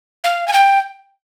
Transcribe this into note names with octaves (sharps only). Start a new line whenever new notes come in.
F5
G#5
G5